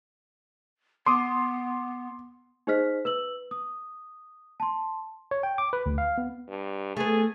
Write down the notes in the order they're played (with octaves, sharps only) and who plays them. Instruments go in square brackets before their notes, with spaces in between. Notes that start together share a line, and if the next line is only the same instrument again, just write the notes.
[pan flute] B3 [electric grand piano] C6 D6 D#6
[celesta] D#4 G#4 C5 D#5 F6 B6
B4 E6 F#7
D#6
A5 C6
[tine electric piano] C#5
G5
D6
B4
D2
F5
B3
[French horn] G2
[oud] A3 B3 [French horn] G#4